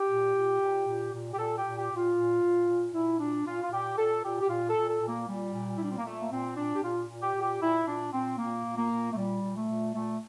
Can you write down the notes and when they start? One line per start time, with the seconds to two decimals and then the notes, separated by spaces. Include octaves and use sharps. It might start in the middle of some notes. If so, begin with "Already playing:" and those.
Already playing: G4
0.09 A#2
0.35 A#2
0.61 A#2
0.87 A#2
1.13 A#2
1.33 G4
1.38 A#2 A4
1.57 G4
1.64 A#2
1.77 G4
1.90 A#2
1.96 F4
2.16 A#2
2.42 A#2
2.68 A#2
2.94 A#2 E4
3.19 A#2 D4
3.45 A#2 F4
3.62 F4
3.71 A#2 G4
3.97 A#2 A4
4.23 A#2 G4
4.41 G4
4.49 A#2 F4
4.70 A4
4.76 A#2
4.89 A4
5.01 A#2
5.08 A#3
5.27 A#2 G3
5.53 A#2
5.76 E4
5.79 A#2 D4
5.90 C4
5.98 A#3
6.05 A#2 A3
6.20 A#3
6.31 A#2 C4
6.57 A#2 D4
6.74 G4
6.83 A#2 F4
7.08 A#2
7.22 G4
7.35 A#2
7.41 G4
7.61 A#2 E4
7.86 A#2 D4
8.13 A#2 C4
8.38 A#2 A#3
8.65 A#2
8.77 A#3
8.91 A#2
9.12 A3
9.16 A#2 G3
9.42 A#2
9.56 A3
9.68 A#2
9.94 A#2 A3